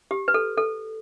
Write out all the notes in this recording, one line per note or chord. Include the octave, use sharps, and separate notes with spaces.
G4
B4
A4
A4